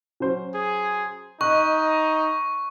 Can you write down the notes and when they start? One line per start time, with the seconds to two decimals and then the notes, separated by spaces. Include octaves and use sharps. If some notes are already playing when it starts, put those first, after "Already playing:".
0.20 F#3 C#4 C5
0.55 G#4
1.41 D#4 D#5 C#6 F#6